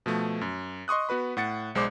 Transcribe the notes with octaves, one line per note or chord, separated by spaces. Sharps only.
B2 F3 A3
F#2
D#5 C6 C#6 D#6 F#6
B3 F#4 B4 B5
A2 F#5 A6 C#7
B1 G#3 C5 D5 D6